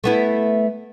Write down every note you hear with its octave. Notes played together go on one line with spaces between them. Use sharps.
A3 B3 E4